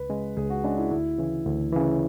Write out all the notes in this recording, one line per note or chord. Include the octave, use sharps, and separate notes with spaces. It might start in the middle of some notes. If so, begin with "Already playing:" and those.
Already playing: C#2 B4
C#3 G#3
C#2 G#4
F#4
C#3 G#3 D4
E4
D2 E4
C#3 E3
D2
C#3 E3